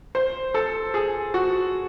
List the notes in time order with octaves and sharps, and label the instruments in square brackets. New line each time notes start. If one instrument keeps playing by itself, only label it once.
[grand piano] C5
A4
G#4
F#4